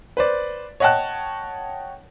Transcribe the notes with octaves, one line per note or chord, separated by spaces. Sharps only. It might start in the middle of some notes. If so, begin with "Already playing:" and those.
B4 C5 D5
C#5 D#5 F#5 G5 A5 F#6